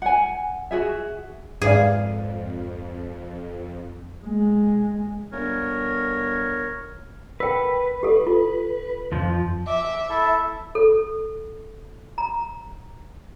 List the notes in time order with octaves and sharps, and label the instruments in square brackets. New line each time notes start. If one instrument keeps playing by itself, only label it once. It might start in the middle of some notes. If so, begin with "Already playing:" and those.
[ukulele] F#5 G#5
F#4 G#4 E5
[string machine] F2 [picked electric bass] G#2 [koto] G#4 [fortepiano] B4 D5 F5
[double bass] G#3
[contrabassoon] G1 [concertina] A#4 C#5
[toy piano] A#4 G5 [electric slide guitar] B4
[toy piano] G4 A4
F4
[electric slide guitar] F2 F3
[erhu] E5 [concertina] D6
[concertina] E4 A4
[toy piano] A4
A#5